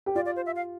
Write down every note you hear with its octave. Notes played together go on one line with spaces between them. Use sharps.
G4
F4 D5
D5
C5
E5
F5